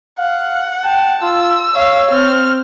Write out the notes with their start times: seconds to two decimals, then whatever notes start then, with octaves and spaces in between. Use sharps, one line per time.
0.19 F5 F#5
0.84 G5 A5
1.22 F4 E6
1.75 C#5 F5
2.11 C4 F6